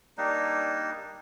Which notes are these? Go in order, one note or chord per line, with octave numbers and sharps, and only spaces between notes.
G3 A#3 D4 D#4